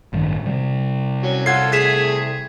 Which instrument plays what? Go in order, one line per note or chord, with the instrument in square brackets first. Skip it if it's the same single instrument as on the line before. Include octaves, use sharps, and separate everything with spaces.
[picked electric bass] A1 G2 D#3
C3 G3
[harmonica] F#3 C#4
[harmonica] F4 A4 [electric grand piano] F#5 G#6 C7
[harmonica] A3 G#4 [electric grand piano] G#6 B6 E7